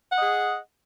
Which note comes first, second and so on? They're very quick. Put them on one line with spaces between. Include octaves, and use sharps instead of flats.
F#5 D#5 G#4